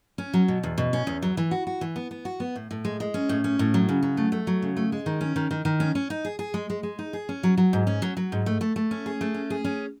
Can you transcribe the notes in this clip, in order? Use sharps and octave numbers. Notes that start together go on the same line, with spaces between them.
C#4
F#3
B2
E2
B2
C#4
E2
F#3
E3
F#4
F#4
E3
B3
B3
F#4
B3
A2
A2
G#3
G#3
C#4
A2
C#4
A2
F#3
C#3
F#3
A3
A3
F#3
C#3
A3
G#3
D#3
C#4
D#3
D#3
D#3
C#4
C#4
D#4
G#4
G#4
G#3
G#3
G#3
D#4
G#4
C#4
F#3
F#3
G#2
C#4
F#3
F#3
G#2
A3
A3
A3
C#4
G#4
A3
C#4
G#4
C#4